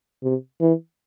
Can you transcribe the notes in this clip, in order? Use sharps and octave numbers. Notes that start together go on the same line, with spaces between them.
C3
E3